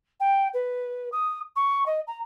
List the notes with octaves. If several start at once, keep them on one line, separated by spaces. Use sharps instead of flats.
G5
B4
D#6
C#6
D#5
A#5